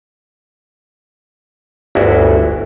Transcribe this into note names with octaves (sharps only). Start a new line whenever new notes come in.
G1 D2 E4 F#4